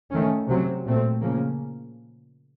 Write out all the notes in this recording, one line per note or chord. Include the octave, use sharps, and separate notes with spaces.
D#3 A3 C#4
C3 F#3 C4
A#2 A3 C4
C#3 F3 A#3 C#4